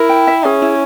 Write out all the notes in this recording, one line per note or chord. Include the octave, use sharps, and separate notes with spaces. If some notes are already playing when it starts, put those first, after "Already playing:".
Already playing: E4 A#4
G5
E5
C#4 G#4
E4